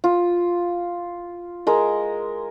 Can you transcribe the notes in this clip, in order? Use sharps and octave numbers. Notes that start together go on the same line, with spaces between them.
F4
G#3 A#4